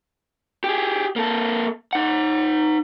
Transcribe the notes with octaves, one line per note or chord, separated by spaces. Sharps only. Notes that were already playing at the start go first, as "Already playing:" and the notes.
G4 G#4
A#3 A4
D#4 F#5